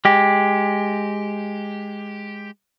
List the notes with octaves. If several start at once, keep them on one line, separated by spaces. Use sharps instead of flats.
G#3 G4